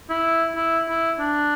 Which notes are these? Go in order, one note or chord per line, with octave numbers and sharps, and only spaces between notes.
E4
E4
E4
D4